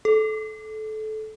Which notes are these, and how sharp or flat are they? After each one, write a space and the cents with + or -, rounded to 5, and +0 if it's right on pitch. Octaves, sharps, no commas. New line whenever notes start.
A4 -20